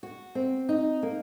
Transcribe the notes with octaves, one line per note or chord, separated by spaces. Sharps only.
F#4
C4
D#4
A#3